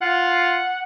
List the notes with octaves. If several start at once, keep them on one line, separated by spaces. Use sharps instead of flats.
F4 F#5